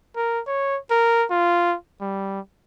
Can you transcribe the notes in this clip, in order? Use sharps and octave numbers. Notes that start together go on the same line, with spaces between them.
A#4
C#5
A#4
F4
G3